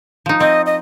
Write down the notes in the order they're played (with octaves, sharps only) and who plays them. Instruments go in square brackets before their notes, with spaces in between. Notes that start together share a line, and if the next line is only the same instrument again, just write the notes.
[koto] F3 D#4
[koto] C4 [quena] D#5
[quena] D#5